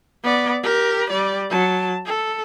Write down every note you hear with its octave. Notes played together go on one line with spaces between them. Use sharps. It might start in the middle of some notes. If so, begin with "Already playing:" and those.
B3 D5
G4 A#4
G3 D5
F#3 A5
A4